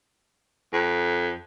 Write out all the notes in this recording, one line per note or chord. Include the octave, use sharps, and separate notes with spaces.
F2